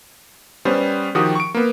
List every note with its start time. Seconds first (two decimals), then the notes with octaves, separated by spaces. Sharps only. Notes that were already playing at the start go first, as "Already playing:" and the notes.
0.65 G3 B3 C#4 C5
1.15 D#3 F3 F#4 G4 D#6
1.35 C#6 D7
1.55 A#3 B3